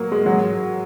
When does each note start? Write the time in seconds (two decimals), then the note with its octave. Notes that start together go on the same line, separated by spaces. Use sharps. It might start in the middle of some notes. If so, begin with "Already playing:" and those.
Already playing: F#3 A#3
0.12 G#3
0.26 F#3